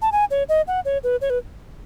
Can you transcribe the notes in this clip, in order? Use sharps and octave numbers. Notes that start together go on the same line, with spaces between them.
A5
G#5
C#5
D#5
F#5
C#5
B4
C#5
B4